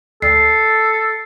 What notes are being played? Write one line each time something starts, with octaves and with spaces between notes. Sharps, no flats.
D2 A4 C7